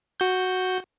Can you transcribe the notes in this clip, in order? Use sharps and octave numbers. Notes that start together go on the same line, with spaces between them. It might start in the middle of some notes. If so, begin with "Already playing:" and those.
F#4 G6